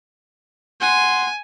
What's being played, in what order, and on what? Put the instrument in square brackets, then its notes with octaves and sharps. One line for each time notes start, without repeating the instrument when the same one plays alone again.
[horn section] F#5 C6 [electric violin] G#5